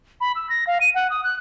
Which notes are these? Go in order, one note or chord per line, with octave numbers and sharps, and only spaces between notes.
B5
E6
A#6
F5
D#7
F#5
D#6
F#6